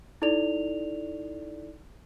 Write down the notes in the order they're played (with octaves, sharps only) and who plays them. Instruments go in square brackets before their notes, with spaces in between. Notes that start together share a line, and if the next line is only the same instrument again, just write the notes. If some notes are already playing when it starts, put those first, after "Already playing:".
[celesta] D#4 E4 A4 D5 F7